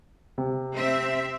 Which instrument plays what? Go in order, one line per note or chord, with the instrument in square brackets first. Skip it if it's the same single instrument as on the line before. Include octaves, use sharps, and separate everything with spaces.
[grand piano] C3
[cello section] C4 E5